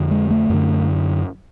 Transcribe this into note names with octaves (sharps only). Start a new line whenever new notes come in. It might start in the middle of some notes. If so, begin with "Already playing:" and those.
Already playing: F2 D3
G#3
A3
F#2 D3